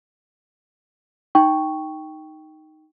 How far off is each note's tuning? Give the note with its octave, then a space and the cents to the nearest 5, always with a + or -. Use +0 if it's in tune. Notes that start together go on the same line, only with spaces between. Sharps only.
D#4 +0 G5 +0 C#6 +0